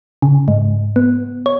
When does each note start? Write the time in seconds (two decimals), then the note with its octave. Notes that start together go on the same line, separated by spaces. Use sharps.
0.22 C#3
0.48 G#2
0.96 B3
1.46 C#5